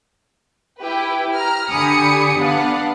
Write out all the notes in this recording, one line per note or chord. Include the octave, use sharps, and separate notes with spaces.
E4 G4 B4
A#5 F6
D3 G4 G#5 B5 D#6 C#7
B3 D4 F5 F#5